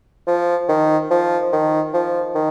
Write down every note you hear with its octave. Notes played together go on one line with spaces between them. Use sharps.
F3
D#3
F3
D#3
F3
D#3